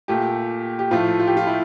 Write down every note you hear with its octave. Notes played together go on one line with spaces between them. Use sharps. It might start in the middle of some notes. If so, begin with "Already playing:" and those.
A#2 A3 G4
G4
A2 F3 A3 F4
F4
G4
F4
E4